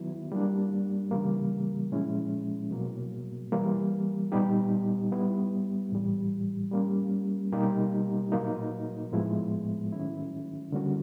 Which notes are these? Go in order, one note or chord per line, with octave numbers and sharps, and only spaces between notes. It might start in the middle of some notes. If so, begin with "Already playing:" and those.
Already playing: D#3 F#3 B3 E4
G3 A#3 D4
C#3 E3 G3 A#3
A#2 F3 G#3 C#4 E4
B2 F#3 A#3
E3 G3 A#3
A#2 G3 B3 D#4 G4
G3 B3 E4
A2 E3 G3
G3 A#3 C#4
B2 G3 A#3 D#4 G4
A#2 F#3 A#3 D#4
A2 F3 G#3 B3 E4
D#3 F#3 A3 C#4 E4
D3 G3 A#3 C#4 F#4